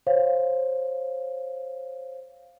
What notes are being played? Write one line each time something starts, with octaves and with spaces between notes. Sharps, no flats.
C5 C#5 F5